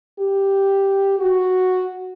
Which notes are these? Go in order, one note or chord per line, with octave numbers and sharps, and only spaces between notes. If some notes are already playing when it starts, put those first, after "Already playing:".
G4
F#4